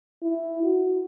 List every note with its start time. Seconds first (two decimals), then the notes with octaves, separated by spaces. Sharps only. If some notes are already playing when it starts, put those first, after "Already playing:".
0.23 E4
0.63 F#4